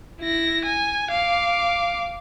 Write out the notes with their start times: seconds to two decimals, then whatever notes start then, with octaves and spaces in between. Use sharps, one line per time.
0.20 E4 A#6
0.65 G#5
1.10 F5 D6